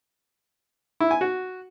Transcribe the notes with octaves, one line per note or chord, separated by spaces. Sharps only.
E4
G#5
F#4